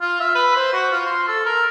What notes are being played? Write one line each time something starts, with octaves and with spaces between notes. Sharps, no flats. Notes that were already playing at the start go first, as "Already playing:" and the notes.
F4
E5
B4
C5
F#4
F4
C6
A4
A#4